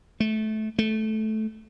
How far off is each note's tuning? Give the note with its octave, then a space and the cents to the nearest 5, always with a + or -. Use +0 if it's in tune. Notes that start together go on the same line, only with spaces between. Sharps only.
A3 -20
A3 -15